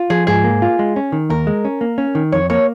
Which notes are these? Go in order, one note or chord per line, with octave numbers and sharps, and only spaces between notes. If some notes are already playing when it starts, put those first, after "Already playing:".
Already playing: F4
F3 G#4
G#2 G#4
A#3
F4
G#3
C#4
D#3
D#2 A#4
G#3
C#4
A#3
C#4
D#3
F2 C#5
A#3 C#5